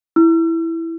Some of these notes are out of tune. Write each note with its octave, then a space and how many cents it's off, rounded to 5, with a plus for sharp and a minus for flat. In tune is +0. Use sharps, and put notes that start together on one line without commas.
E4 +0 E6 +45